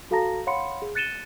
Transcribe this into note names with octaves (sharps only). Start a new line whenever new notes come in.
F#4 A4 F5 A5 A#5 A#6
C#5 F5 F#5 B5 C6 C#7
G#4
F#6 A6 C#7 D#7 E7 G7